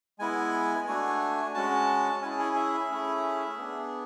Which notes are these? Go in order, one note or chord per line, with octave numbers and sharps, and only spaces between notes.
G#3 B3 E4 G#5
A3 D4 F#4 G#5
G#3 C#4 F#4 A5
C#4 E4 G#4 G#5
G#5
E5
A3 C#4 E4 G#4
B3 D4 G#4